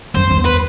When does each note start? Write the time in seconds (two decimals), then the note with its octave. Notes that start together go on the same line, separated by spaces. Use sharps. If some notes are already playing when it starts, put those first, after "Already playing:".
0.14 F#2 C5
0.31 E2
0.45 B4